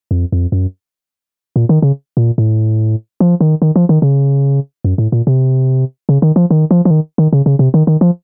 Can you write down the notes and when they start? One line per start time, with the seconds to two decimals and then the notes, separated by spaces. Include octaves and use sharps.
0.11 F2
0.32 F2
0.52 F#2
1.56 A#2
1.69 D#3
1.82 C#3
2.17 A#2
2.38 A2
3.20 F3
3.41 D#3
3.62 D#3
3.76 F3
3.89 D#3
4.02 C#3
4.84 F#2
4.98 A2
5.12 A#2
5.27 C3
6.09 C#3
6.22 D#3
6.36 F3
6.51 D#3
6.71 F3
6.85 F3
6.91 D#3
7.18 D#3
7.33 C#3
7.46 C#3
7.59 C3
7.74 D#3
7.87 D#3
8.01 F3